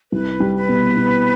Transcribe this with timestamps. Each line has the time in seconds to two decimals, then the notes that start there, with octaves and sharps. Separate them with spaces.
0.12 C2 B4
0.40 G3
0.56 B4
0.69 B2
0.97 B2